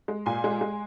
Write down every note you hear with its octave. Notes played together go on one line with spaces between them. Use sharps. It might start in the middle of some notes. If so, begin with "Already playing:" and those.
G#3
A#2 G#5 C6
G#3
G#3